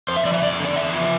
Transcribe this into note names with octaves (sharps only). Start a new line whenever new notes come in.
F2 C5
E5
F3 D5
E5
F2 D5
D3
D5
E2 E5
F3